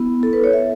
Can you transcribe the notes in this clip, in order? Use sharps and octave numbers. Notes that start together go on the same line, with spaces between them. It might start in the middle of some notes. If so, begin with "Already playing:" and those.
Already playing: B3 E4
A4
B4
C#5
E5